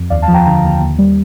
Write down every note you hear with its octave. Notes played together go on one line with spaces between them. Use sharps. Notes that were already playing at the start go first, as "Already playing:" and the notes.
Already playing: F2
D#2 D5 F5
F5 A5
F3
G5 A#5
D3 G5 A#5
D#2
D#2
G3